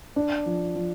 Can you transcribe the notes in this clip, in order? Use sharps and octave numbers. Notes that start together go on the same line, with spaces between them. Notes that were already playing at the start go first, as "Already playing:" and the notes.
D4
F3
F3